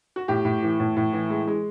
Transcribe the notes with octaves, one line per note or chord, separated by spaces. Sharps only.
F#4
A2 G4
A2
E3
A2
A2
E3
G#3
G#3